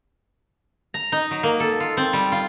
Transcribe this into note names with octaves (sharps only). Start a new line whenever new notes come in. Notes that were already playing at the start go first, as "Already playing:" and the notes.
A#5
D#4
F#3
A#3
A4
F4
C4
G3
F4